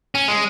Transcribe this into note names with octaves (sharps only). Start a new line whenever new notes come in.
C#4
G#3